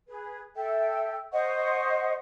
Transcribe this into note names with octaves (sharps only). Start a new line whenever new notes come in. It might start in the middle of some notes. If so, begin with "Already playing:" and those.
G#4 B4
A4 E5 G5
C5 D#5 F#5 C#6